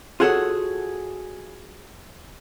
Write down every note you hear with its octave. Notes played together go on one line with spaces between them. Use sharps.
F4 F#4 G#4 A4 C#5 F#5